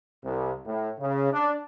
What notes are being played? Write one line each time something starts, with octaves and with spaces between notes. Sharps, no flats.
C2
A2
C#3
D4